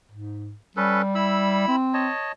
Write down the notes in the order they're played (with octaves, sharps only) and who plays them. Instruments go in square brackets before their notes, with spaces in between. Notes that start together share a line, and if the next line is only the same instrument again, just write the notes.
[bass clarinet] G#2
[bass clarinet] G3 [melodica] C#4 A4 B4
[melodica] E4 B5 E6
[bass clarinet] C4
[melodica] C#5 D#5 A5